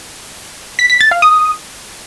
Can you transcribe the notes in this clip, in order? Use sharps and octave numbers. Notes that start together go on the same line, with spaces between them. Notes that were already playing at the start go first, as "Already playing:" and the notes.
B6
B6
A6
F5
D#6